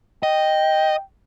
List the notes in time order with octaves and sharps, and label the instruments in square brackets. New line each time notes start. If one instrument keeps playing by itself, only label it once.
[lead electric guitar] D#5 [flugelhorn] G5